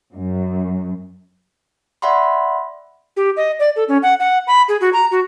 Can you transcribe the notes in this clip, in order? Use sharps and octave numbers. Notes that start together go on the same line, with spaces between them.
F#2
D5 E5 F#5 B5 C6
G4
D#5
D5
A4
C#4
F#5
F#5
B5
G#4
F#4
A#5
F#4